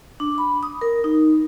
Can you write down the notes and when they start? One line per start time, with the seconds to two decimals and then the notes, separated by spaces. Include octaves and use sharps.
0.20 D4
0.38 B5
0.63 D#6
0.81 A#4
1.04 D#4